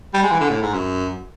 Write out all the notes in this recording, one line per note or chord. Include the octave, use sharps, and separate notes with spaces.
G3
G#3
E3
D3
A2
G#2
F#2